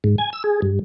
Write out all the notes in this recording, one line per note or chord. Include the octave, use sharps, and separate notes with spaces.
G#2
G#5
E6
G#4
G2